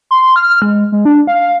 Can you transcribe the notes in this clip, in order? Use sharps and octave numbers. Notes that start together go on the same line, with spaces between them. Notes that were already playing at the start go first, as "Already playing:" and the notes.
C6
F6
G#3
G#3
D4
F5